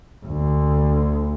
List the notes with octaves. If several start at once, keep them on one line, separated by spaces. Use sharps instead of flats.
D2